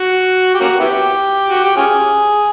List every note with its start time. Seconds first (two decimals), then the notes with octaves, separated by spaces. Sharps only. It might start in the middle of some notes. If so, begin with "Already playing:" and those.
Already playing: F#4
0.54 G4
0.60 A#3 C#4 F#4
0.80 B3 E4 G4
1.50 F#4
1.64 G4
1.76 C#4 F4 G#4